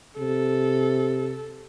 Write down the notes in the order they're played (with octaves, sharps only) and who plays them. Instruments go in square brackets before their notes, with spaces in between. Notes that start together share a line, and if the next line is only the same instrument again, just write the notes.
[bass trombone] C3 [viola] A4